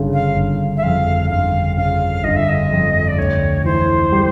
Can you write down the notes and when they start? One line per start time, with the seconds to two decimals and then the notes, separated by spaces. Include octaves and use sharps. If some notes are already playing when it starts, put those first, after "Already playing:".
Already playing: G1 C#3
0.14 F5
0.36 G1
0.77 E5
0.83 F2 F5
1.30 G1 F5
1.77 C#3 F5
2.24 G1 D#5
2.36 E5
2.49 D#5
2.71 F2
3.08 D5
3.17 D2 C#5
3.64 E3 C5
4.12 G3